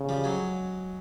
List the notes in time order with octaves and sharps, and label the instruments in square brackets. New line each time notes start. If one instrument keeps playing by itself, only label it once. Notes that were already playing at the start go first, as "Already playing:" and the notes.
Already playing: [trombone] C#3
[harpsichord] F3 G3
F#3 G#3